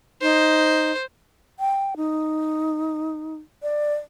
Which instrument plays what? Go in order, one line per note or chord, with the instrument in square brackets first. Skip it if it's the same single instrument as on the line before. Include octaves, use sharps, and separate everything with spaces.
[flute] D#4 [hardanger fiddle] C5
[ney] G5
D#4
D5